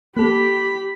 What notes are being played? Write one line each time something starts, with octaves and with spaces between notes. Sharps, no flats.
A#3 G4 A4 B5